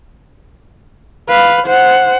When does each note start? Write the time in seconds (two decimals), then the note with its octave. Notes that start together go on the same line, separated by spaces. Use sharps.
1.29 B4 F5
1.67 C5 F#5